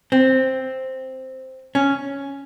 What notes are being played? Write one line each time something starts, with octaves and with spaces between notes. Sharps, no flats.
C4
C#4